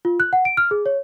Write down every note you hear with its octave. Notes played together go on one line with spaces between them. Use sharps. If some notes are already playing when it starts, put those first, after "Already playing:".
F4
F#6
F#5
D7
F6
G#4
C#5